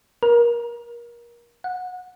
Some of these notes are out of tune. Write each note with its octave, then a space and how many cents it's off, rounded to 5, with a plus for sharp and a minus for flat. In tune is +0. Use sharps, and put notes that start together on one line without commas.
A#4 +25
F#5 -25